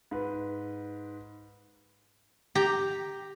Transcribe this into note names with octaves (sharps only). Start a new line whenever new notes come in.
G#2 B4
G4 A#5